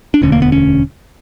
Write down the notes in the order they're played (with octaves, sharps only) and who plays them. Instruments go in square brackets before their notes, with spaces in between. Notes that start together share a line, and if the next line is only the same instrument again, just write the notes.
[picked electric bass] D4
E1 D2 D3 C#4
A#3
B3
C#4